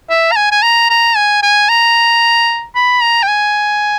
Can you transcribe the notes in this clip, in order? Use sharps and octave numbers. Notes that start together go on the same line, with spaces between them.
E5
A#5
G#5
G#5
A#5
A#5
G#5
G#5
A#5
B5
A#5
G5
G#5